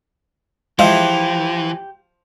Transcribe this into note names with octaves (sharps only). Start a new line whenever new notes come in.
E3 F3 G#3 F4 G4 E5